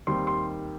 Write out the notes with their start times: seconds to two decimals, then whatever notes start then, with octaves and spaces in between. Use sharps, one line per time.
0.07 D#2 D#3 G3 C4 C6
0.27 C6